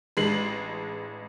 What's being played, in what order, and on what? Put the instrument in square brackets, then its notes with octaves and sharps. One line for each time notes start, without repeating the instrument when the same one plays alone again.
[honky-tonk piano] A1 G#3 D4 C7 F#7